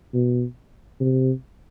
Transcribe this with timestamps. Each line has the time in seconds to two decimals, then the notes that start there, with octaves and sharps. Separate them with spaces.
0.13 B2
1.00 C3